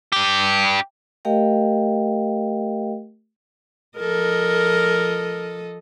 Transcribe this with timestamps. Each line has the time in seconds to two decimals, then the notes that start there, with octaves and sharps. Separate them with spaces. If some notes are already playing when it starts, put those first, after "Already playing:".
0.12 D4 G4
1.25 A3 G4 A#4 D#5 F5 G5
3.98 F3 A4 A#4 D#5